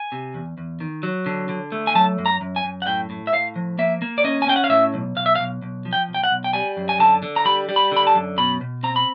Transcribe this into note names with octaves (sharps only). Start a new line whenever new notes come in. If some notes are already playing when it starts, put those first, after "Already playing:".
Already playing: G#5
C3
E2
E2
D#3
F#3
D3
D3
A3
G#5
F#3 A5
F#2
A#5
F#2
G#5
F#2
F#5
A2 G5
A2
E5
A2 F5
F3
A#3 E5
A#3
D5
C#4 D#5
G#5
C#4 G5
F#5
F5
A2 E5
B1
B1 F5
E5
F5
B1
B1
F3
G5
B1
G5
F#5
B1
G5
G3 G#5
F#2
G#5
D3 A5
D3
A#5
G3 B5
G3
B5
D3 B5
A5
F#2
B2 B5
B2
C4 A#5
B5